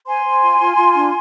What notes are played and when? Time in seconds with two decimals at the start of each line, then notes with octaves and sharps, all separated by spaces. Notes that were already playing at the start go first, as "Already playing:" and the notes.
0.07 C5 G#5 C6
0.25 C5
0.43 F4
0.60 F4
0.77 F4
0.95 D4